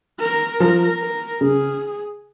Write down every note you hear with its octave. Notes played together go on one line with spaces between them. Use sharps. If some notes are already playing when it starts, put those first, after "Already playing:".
A#4
F3 A#4
A#4
C#3 G#4